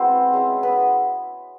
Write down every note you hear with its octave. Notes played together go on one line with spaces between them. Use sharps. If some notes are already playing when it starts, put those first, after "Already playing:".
Already playing: G#3 B3 C4 E4 F#4 C5
G#3 C#4 E4
B3 B4